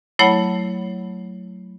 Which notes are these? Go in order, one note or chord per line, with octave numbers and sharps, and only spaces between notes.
F#3 A3 E4 C#5 F#5 B5